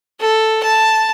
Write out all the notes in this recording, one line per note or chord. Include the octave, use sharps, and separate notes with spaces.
A4
A5